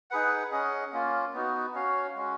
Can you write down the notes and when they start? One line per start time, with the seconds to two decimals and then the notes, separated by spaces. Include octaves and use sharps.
0.11 D#4 G#4 B4 F#5
0.51 C#4 G#4 D#5 F#5
0.93 A#3 C#4 F4
1.33 B3 D#4 F#4
1.75 C#4 F#4 C#5 F5
2.15 G#3 C#4 F#4